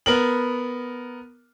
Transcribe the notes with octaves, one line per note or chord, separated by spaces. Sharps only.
B3 A#4 F#7